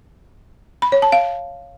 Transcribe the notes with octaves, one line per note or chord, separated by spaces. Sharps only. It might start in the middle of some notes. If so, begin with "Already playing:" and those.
B5
C#5
A5
F5